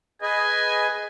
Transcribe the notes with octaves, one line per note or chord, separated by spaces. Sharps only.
G#4 B4 D#5 G#5